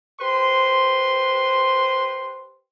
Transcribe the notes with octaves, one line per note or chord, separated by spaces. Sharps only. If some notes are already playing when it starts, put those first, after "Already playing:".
G4 B4 C5 C6